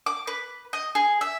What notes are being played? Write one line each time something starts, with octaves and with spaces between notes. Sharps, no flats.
D6
B4
D#5
G#4
E5